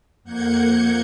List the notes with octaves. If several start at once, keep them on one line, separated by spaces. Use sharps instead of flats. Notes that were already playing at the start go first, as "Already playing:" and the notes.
F2 A#3 F#5 G6 G#6 C#7